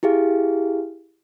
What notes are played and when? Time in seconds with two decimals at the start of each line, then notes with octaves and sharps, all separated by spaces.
0.03 E4 G4 G#4 F5